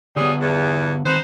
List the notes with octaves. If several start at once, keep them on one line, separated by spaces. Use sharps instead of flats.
D3 F#3 G3 B3 G#4
E2
D#3 C4 D#4 B4 C5